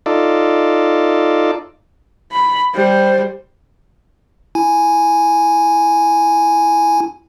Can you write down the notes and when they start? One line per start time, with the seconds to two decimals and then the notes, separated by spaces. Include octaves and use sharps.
0.06 D#4 F4 A4 D5
2.32 B5
2.74 G3 C5
4.55 E4 G#5